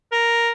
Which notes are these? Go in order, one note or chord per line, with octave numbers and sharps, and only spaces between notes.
A#4